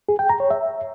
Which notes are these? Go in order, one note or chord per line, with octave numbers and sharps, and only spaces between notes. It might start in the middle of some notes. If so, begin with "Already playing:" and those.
G#4
G5
A#5
C#5
E5